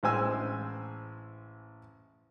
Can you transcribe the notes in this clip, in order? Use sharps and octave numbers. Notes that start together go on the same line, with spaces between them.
A1 G#3 C5 G#5 E6